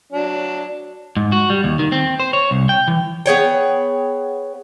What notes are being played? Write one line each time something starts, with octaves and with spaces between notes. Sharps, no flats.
F#3 D4
G#2
F#4
G3
D#2
D#3
C4
C5
C#5
C2
G5
E3
B3 G#4 C#5 G5